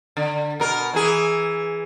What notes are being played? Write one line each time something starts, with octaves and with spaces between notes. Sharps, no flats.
D3
B2 A#4
E3 G#4